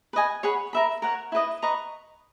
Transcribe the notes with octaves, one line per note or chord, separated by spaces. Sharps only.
B4 D#5 G#5
G#4 C#5 F#5 B5
A#4 E5 B5
A#4 C#5 F#5
E4 B4 D#5
B4 D#5 A#5 C#6